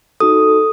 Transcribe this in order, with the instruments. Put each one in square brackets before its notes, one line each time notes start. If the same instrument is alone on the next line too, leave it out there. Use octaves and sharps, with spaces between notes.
[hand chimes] D#4 F#4 A4 D#6